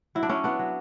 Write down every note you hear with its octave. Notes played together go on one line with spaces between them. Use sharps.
F#3 E4
D4
C#4 E4
B3 D4
F#3